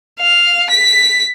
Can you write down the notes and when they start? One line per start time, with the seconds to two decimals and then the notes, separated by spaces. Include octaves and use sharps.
0.20 F5
0.70 B6